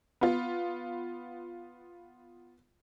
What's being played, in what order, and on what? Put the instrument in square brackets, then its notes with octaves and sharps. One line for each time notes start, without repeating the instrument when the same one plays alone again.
[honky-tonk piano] B3 F4